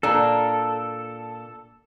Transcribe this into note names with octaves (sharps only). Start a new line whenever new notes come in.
A#2 A#3 D4 A4